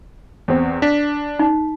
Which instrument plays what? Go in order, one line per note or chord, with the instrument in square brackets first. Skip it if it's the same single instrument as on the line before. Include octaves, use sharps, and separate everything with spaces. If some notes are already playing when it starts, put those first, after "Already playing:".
[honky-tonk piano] E2 C4
[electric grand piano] D4 [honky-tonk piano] B6
[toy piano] D#4